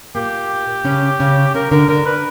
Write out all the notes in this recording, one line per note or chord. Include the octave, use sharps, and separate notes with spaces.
A#2 A#3 G4
C#3 C#4
C#3 C#4
C#3 C#4 A#4
D3 D4 A#4
D3 D4 A#4
B4